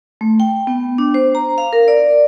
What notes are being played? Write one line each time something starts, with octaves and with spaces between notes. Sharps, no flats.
A3
G5
B3
D4
C5
A#5
F5
A#4
D5